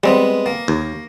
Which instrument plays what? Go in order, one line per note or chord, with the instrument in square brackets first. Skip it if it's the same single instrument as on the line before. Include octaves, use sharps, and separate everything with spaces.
[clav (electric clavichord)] G3 C4 [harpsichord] G#3 B3
[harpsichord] A#3
[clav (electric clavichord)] D#2